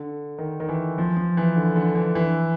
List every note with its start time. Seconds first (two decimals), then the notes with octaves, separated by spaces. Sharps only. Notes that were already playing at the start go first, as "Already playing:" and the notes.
Already playing: D3
0.38 D#3
0.60 D#3
0.69 E3
0.98 F3
1.17 F3
1.37 E3
1.56 D3
1.76 D3
1.95 E3
2.15 E3